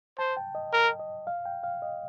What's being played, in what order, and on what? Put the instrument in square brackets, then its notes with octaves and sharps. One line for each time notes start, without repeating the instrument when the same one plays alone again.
[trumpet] C5 [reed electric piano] A5
[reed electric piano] G5
D#5
[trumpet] A#4
[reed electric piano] D#5
F5
G5
F5
D#5